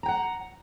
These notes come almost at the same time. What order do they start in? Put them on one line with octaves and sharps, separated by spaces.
A#5 G5 F#5